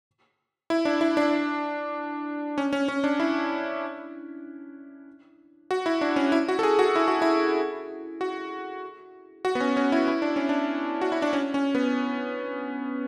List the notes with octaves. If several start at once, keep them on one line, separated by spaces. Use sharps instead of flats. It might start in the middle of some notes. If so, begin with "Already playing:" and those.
E4
D4
E4
D4
C#4
C#4
C#4
D4
E4
F#4
E4
D4
C#4
E4
F#4
A4
G#4
F#4
E4
F#4
E4
F#4
F#4
B3
C#4
C#4
E4
E4
D4
C#4
D4
F#4
E4
D4
C#4
C#4
B3